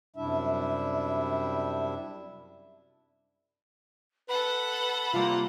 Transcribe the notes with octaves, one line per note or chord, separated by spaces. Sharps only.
F#2 C3 G3 D4 E4 E5
A4 B4 F#5 B5
C3 G3 A#3 F4